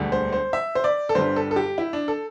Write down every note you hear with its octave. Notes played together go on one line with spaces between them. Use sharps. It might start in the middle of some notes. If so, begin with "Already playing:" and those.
Already playing: E1 D2 D3 G3
C5
C5
E5
C5
D5
A4
G1 G2 D3 G3 C5
A4
A4
G4
E4
D4
A4